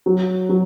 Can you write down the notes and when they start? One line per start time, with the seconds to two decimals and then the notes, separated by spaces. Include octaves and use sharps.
0.06 F#3
0.49 F#3